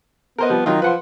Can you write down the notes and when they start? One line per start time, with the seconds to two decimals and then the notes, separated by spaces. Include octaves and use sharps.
0.38 B3 A#4 C5 D#5
0.50 F3 G3
0.66 D#3 F#3 F4
0.82 F3 B4 F#5 C6